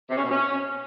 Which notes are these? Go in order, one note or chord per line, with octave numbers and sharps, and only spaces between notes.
C3
C#4
B2
C#4